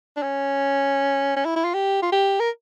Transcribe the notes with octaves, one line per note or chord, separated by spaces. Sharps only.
D4
C#4
C#4
E4
E4
F4
G4
F4
G4
A#4